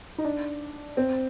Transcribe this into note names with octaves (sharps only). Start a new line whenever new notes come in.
D#4
D4
C4